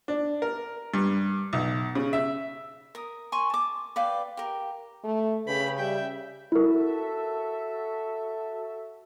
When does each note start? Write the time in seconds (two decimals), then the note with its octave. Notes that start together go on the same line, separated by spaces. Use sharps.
0.08 D4
0.42 A#4
0.94 G2
1.53 B1
1.95 C#3
2.13 E5
2.95 A#4 D#6
3.32 G#5 C6 C#6
3.50 A5 D6
3.96 B4 D5 F5 G5
4.37 G4 A#4
5.04 A3
5.47 C#3 G4 B4 B5
5.79 G3 E5 G5
6.52 E4 F#4 A4 A#4 E5